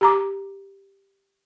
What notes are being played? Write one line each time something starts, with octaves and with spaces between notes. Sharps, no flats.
G4 A#5 D6